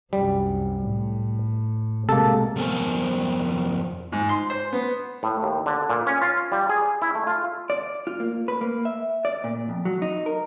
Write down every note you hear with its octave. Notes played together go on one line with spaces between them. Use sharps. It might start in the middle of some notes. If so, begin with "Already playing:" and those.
C2 F#2 G3
A2
B1 C3 G#3 A#3 A4
F2 B3 A#4 C5 G#5
G#2
C6
C5
B3
A2
D#2
D3
A#2
C#4
F4
G3
G#4
E4
A3
F4
D5
F4
A#3
B4
A#3
E5
D5
A#2
F2
F#3
D#4
A#4